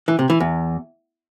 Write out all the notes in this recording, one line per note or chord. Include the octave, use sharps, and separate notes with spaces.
E3
C3
E3
E2